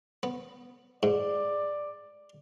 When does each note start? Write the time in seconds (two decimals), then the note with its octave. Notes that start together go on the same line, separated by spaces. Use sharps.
0.23 B3
1.03 G#2 D5